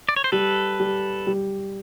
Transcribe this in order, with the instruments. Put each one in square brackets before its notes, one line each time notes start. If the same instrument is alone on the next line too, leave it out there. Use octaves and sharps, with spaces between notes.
[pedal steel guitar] D5
C#5
C5
[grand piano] G3 [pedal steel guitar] A4 B4
[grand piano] G3
G3